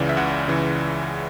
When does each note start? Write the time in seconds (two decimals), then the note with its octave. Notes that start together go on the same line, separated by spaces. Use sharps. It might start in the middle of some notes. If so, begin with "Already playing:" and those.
Already playing: C#2 C#3 E3 D5
0.09 E5
0.17 C#2 F#5
0.48 C#3 E3